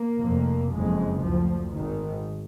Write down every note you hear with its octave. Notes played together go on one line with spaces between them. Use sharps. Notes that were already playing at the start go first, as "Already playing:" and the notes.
Already playing: A#3
F1 F2
F#1 F2 G#3
D2 F3
G#1 G#2 D#3